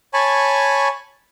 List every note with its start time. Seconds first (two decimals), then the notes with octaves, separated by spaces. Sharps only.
0.14 C#5 G#5 A5 B5 C#6